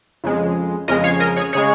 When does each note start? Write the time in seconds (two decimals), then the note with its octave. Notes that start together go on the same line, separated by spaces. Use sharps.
0.24 F2 C#3 G#3
0.88 F2 C#3 G#3 A#4 D#5
1.04 C#5 F5
1.20 A#4 D#5
1.37 G#4 C#5
1.53 C#3 G#3 G#4 C#5